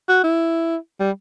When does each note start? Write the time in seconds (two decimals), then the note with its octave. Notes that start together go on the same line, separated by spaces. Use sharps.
0.09 F#4
0.24 E4
1.00 G3